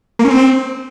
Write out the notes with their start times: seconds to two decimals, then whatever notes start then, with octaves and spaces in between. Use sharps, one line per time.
0.19 A#3
0.25 C#4
0.30 C4